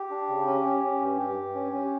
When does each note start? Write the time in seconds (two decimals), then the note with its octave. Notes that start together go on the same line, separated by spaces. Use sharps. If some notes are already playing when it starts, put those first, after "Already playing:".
Already playing: G4
0.11 D4
0.29 C#3
0.47 C#4
0.65 C#4
0.84 C#4
1.01 G2
1.19 G2 G4
1.37 G2
1.55 C#4
1.73 C#4